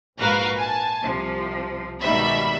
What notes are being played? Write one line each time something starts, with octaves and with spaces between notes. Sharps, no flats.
A#1 G#2 F#4 A#4 B4 F5
G#5 A5
C2 C3 F3
G#2 B2 D#3 G3 E5 B5